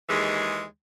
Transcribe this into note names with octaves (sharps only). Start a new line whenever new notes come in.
D#2 E3 G#3